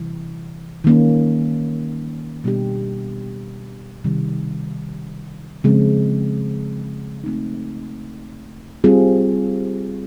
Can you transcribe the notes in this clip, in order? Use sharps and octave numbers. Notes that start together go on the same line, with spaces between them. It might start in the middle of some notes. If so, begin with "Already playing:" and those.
Already playing: C3 E3 G3
D#3 G3 A#3 C#4
B2 G3 B3 D4 G4
C3 D#3 G3
C#3 F3 G#3 C4
A3 C4 D#4
G3 C4 F4 G#4